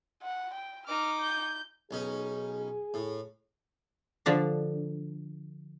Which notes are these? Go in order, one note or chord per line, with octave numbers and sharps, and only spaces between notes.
F#5
G5
D#4 D6 F6
G6
B1 C#4 D#4 G#4
A2
D3 F3 D4